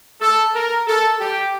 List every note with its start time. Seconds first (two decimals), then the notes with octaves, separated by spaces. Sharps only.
0.21 A4
0.55 A#4
0.87 A4
1.20 G4